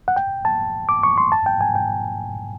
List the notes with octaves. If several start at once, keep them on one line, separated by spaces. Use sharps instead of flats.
F#5
G5
A5
D6
C#6
C6
A5
G5
G#5
G5